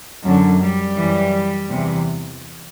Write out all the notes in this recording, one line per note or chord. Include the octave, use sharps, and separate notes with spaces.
F#2 D3
G3
F#2 E3
E2 C3 E3